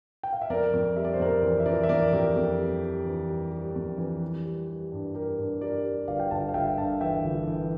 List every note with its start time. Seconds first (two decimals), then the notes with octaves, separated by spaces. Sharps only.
0.23 G5
0.33 F5
0.41 E5
0.50 F2 A#4 D5
0.73 F2
0.96 G3 E5
1.05 D5
1.14 C5
1.19 F2 A#4 D5
1.43 E3
1.60 E5
1.66 E3 A#4 D5
1.83 E5
1.89 F2 A#4 D5
2.13 F2 G4 A#4
2.36 F2
2.59 G3
2.82 G3
3.06 E3
3.29 G3
3.52 G3
3.75 F2
3.98 E3
4.22 G3
4.45 G3
4.69 G3
4.92 G2
5.15 G3 G4 A#4
5.39 G2
5.61 G3 A#4 D5
5.84 G3
6.08 G1 D5 F5
6.20 G5
6.31 G1 F5 A5
6.49 F5
6.54 G1 E5 G5
6.78 G2 F5 A5
7.01 E3 E5 G5
7.24 G1
7.47 E3